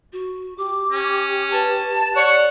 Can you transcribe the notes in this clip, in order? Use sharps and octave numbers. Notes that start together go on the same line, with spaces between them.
F#4
G4 D6
C#4
B4 A5
C#5 D5 F#5